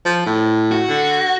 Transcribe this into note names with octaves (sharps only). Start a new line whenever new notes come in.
F3
A2
F#4
D3